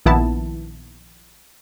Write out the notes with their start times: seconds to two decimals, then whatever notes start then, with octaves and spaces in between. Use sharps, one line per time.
0.06 A#1 D#3 B3 E4 A5